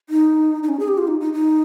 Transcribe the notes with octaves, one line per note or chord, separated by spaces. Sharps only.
D#4
D#4
C#4
G#4
G4
F4
D#4
D#4
D#4